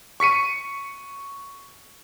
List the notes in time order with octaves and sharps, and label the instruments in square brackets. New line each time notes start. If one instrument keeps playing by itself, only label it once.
[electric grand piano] C#6 B6 C#7 D#7